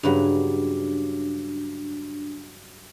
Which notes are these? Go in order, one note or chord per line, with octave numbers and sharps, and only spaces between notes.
G2 C#3 F#3 D4